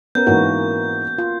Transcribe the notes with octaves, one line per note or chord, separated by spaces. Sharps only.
B3 C#4 A#4 G6
G#2 E3 A#3 F#4 A#4
F4